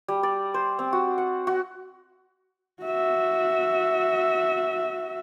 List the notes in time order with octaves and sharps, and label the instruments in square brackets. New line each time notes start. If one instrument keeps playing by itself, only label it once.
[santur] G3
D5
C5
C4
F#4
F#5
F#4
[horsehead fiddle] F#4 E5